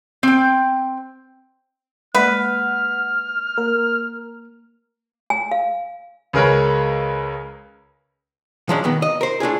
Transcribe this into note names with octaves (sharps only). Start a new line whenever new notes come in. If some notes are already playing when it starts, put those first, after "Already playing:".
C4 G5
G#3 A#3 B4 D5 F#5 F6
A#3 A#4
G#5
F5
C#2 G#4 A#4 B4 C#5
F3 F#3 G#3 C#4 D4
B2 D#3 B3
D#5
A#4 C5
A2 D4 F4 G#4